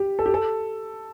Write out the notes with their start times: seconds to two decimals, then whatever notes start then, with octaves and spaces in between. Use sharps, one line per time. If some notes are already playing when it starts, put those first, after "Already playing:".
Already playing: G4
0.19 A4
0.26 G4
0.34 A4